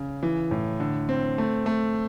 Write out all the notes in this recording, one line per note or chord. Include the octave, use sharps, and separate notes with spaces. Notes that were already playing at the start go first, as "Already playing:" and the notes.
Already playing: C#3
E3
A2
D3
C4
A3
A3